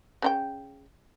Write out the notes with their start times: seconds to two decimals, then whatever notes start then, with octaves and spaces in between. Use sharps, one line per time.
0.22 C#3 D#4 G5